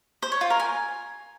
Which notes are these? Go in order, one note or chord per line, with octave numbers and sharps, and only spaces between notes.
C5
C#5
F4
A#4
G#5